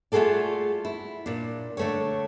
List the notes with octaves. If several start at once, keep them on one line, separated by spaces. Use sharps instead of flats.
A3 F4 F#4 G#4 A4 D5
E4
A#2 D4
D3 A3 C#5